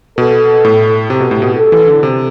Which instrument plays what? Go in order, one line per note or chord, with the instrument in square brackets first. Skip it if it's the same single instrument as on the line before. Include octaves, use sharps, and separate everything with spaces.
[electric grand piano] B2 [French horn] A4
[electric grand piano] A2
[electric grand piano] C3 [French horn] G4
[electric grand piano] B2
A2
B2
[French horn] A4
[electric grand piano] E3
D3
C3